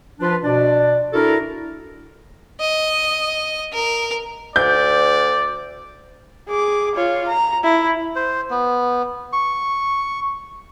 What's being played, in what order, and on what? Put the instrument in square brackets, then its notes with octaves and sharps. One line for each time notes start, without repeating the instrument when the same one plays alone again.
[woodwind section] F3 D4 F4 B4
B2 D4 D5
D4 E4 F#4 A4 A#4
[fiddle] D#5
A#4
[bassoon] D2 [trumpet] D5 [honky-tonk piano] G6
[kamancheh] G#4 D6
F4 C#5
A#5
E4
[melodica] C5
B3
C#6